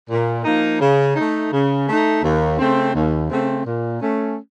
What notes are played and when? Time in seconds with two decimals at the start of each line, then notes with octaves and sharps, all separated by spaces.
0.10 A#2
0.45 F3 A#3 D#4
0.80 C#3
1.15 A3 D#4
1.52 C#3
1.86 A3 D#4
2.22 D#2
2.59 C#3 A3 C4
2.94 D#2
3.29 C#3 A3 C4
3.65 A#2
4.01 A3 C#4